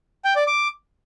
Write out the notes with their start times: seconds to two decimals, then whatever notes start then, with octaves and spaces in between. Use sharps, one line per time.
0.25 G5
0.36 D5
0.47 D6